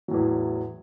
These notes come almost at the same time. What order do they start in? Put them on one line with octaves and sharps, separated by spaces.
F#3 A2 E2